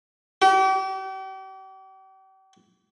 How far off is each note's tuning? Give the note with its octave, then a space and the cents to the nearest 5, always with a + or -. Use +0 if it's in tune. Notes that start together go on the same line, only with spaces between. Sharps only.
G4 -40